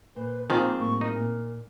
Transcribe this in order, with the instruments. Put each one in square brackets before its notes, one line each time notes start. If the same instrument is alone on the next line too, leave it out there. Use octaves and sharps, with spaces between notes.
[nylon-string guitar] A#2 C5 [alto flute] B4
[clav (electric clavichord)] D#3 F3 [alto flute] A#3 [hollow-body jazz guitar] C4 F4 G#4
[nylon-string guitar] A2 G3 A#3 [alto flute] C#6
[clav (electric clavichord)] D#4 [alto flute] A#4
[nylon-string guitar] A#2